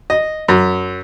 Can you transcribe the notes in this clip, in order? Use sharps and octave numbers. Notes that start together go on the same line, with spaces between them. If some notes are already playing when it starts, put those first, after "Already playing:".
D#5
F#2